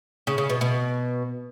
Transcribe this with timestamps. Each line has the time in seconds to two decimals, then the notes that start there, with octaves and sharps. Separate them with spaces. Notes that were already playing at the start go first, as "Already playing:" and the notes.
0.27 C#3
0.38 C#3
0.50 B2
0.61 B2